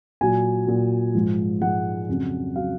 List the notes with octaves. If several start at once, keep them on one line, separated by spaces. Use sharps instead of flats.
A#2 F#3 G#5
A#2 F#3
G#2 F3 G#3
G#2 F3 G#3 F#5
F2 C#3 F#3
C#3 F#3 F5